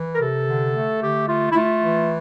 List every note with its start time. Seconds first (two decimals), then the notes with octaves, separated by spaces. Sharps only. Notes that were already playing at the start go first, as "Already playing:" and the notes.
Already playing: E3
0.14 A#4
0.20 C3 A4
0.47 D3
0.74 A3
1.01 D3 G4
1.28 A3 F4
1.51 E4
1.56 A3 F4
1.83 E3